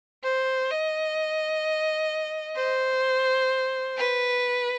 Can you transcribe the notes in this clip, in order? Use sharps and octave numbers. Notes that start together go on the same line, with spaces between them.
C5
D#5
C5
B4